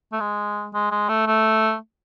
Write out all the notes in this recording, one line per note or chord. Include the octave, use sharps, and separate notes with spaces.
A3
G#3
G#3
G#3
A3
A3